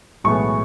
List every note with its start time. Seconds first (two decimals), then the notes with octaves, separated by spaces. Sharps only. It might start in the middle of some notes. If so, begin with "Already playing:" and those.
0.24 B1 A2 E3 G#3 B3 C#6